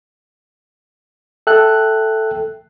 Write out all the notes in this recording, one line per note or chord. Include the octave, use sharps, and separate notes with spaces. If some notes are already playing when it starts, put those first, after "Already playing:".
A4 E5 G5 F#6